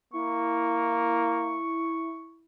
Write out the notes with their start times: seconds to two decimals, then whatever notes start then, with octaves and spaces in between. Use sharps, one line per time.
0.13 A#3 E4 C#6